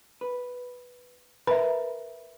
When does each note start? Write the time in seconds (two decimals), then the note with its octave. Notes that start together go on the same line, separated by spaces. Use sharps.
0.21 B4
1.47 A#4 B4 E5 B5